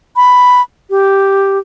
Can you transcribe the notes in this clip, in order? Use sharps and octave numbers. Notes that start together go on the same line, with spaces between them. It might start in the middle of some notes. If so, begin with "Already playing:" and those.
B5
G4